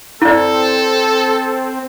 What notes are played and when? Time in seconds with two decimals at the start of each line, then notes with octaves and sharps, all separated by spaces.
0.22 C4 E4 A4 D5